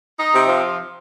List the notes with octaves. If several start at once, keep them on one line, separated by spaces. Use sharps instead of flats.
D#4
C3
F3